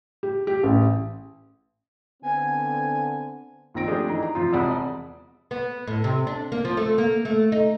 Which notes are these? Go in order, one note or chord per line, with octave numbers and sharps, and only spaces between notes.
G4
G4
A1
D3 B3 C4 G#5
A#1 D#3 C4 A#6 D7
F3 A3 D4 G4 G#4
E3 D#4
A#5
C3 F3 F4
E1 C3 G#3 D5 F#5 B5
B3
A2
C3
D4
A#3
F3
A3
A#3
A3
D#4